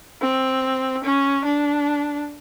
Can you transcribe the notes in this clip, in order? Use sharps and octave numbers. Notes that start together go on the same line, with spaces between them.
C4
C#4
D4